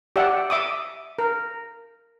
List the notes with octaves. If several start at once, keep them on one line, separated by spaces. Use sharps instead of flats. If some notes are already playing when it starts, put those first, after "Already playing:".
G4 D5 E5 F#5
E5 D6 D#6
A#4